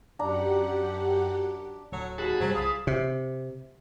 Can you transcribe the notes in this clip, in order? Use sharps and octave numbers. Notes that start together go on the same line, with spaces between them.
F#2 D4 G4 F#5 A#5
D1 F#3 A4 C#5
D#2 F#4 G#4 A5 B5
F#2 C3 F#3 G3 C5
C2 F4 D#6
C3